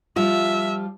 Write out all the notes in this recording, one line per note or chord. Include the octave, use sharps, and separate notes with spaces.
F3 G3 F4 E5